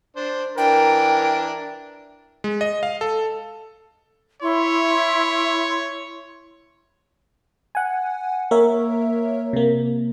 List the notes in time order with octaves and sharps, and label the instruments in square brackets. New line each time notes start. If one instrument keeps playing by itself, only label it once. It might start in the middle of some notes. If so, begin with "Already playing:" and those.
[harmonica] D4 C5
[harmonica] E3 D4 [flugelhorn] A#4 [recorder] G5
[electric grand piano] G#3
D#5
F5
A4
[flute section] E4 C6 [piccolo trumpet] C#5
[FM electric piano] F#5 G#5
A#3 A#4 C#5 E5
C3 A#3